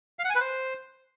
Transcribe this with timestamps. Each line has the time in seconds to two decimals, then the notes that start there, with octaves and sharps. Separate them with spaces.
0.19 F5
0.24 F#5
0.30 G#5
0.35 B4
0.40 C5